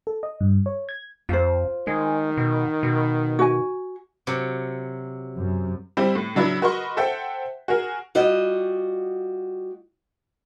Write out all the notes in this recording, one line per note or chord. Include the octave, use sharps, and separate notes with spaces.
A4
D#5
G2
C#5
G#6
F2 F4 C5
D#3 G#3
B2
B2
F#4 G#5
C3 F#3
F#2
G3 C4 E4 G4 C5
A2
C#3 F#3 D4 E4 B4
F#4 A#4 B4 D#5 C6 C#6
A4 C5 E5 F#5 G5
F#4 G#4 A#4
G3 F4 F#4 D#5